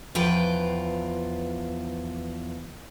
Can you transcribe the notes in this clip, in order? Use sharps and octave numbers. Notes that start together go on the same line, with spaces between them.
E2 F3 F4 B4 G5